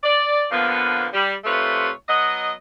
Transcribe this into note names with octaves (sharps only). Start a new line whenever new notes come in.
D5
D3 F3 A#3 B3
G3
C3 A3 F4 B4 C#5
F#3 B3 D#5